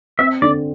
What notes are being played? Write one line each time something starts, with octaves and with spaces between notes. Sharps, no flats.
C4 E5
D3 D5